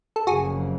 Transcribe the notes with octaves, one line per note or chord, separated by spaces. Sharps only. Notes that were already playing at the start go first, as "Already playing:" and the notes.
A4
F#1 F2 C#3 F#3 A#3 F#4 G#4